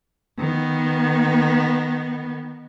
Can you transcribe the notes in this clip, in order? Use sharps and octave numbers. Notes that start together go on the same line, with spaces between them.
D#3 B3